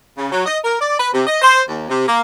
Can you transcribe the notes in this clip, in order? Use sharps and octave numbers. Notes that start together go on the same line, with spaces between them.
C#3
F#3
D#5
A#4
D5
B4
C3
D#5
C5
D#2
C3
A#3